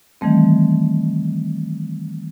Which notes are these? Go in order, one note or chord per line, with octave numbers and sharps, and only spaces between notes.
D#3 E3 G3 A3 C4